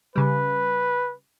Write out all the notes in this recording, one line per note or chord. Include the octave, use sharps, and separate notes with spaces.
C#3 G3 B4